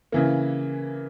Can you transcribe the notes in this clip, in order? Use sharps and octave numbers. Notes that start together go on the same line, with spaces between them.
C#3 E3 A#3